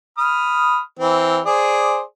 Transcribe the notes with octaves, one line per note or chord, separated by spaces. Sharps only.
B5 D#6 F6
E3 C4
G#4 C5 D5